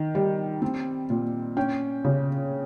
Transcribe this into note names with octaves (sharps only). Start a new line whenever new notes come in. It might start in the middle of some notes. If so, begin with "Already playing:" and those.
Already playing: D#3
G3
C4
A#2
C#4 G5
C#3